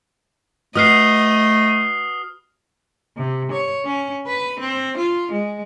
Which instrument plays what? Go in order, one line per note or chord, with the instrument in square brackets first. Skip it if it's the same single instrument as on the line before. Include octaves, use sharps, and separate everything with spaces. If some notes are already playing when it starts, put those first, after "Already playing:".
[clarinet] A3 [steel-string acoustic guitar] F#4 B4 [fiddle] D#5 [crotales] D#6 F6 C7
[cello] C3
C#5
C#4
B4
C4
F4
G#3